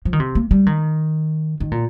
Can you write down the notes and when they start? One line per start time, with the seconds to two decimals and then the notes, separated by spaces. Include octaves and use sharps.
0.05 F3
0.13 D#3
0.20 C3
0.35 A#3
0.51 G3
0.66 D#3
1.60 D#3
1.72 A#2